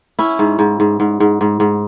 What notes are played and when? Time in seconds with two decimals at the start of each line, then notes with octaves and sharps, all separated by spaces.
0.19 C#4 E4
0.39 G#2
0.59 G#2
0.80 G#2
1.00 G#2
1.20 G#2
1.41 G#2
1.60 G#2